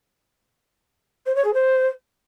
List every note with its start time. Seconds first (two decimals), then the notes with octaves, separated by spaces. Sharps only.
1.26 C5
1.35 C#5
1.44 G#4
1.54 C5